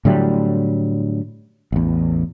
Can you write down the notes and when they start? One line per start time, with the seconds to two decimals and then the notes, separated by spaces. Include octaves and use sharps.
0.05 A2 D3 F#3 G3
1.72 A1 E2